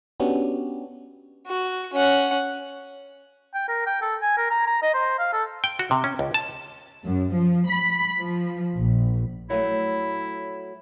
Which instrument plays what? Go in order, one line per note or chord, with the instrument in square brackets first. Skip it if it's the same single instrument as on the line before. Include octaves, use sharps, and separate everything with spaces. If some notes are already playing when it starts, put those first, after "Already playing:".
[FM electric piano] B3 C#4 D4 F#4 G4
[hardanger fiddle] F#4
C#4 F#5
[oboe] G5
A#4
G5
A4
G#5
A#4
A#5
A#5
D#5
C5
F5
A4
[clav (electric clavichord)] G5
F#4
C3
C#4
C#2
A5
[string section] F#2
F3
B5
F3
A#1
[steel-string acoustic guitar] F#3 A3 [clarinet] E4